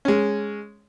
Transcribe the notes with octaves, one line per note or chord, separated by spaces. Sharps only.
G#3 C#4